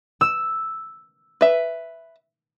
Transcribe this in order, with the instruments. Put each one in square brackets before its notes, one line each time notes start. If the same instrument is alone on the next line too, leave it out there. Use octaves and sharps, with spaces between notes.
[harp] E6
[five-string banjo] B4 E5